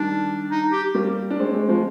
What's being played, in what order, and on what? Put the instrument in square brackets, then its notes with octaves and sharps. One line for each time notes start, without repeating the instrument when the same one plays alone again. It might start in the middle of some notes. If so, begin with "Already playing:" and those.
Already playing: [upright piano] D#3 G3 [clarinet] D4
[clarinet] D#4
G4
[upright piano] G3 A#3
D4
G#3 C4
G#3 C4
F3 G#3